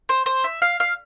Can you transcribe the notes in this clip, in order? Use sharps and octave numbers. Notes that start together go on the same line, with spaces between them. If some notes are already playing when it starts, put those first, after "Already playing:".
C5
C5
E5
F5
F5